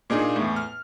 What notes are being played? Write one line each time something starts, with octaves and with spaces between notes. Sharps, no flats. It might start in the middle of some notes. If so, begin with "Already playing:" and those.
A#2 A#3 D4 D#4 G#4
E2 A2
F6